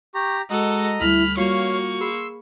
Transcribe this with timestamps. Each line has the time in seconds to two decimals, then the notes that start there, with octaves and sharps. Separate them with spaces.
0.15 G4 A#5 C#6
0.50 G#3 F#4 A4 D#5 A#5
1.01 D2 G3 E4 B5 F6
1.37 G3 A#3 F4 F#4 C#5 F5 C#6
2.01 G#4 B5 C6 E6